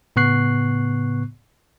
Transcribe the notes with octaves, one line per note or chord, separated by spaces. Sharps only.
A2 C#3 B3 C#6 F#6 C7